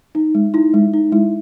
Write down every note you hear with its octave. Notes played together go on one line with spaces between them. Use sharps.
D#4
G#3
D#4 E4
G#3
D#4
G#3 E4